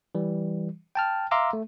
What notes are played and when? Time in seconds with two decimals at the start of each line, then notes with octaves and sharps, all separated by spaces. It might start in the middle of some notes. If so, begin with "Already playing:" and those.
0.15 E3 G3
0.95 G5 A5 F6
1.31 E5 F5 A#5 C6 D6 E6
1.53 A3